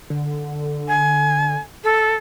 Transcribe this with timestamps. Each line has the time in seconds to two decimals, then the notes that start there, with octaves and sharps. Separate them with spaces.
0.10 D3
0.88 G#5
1.84 A4 E6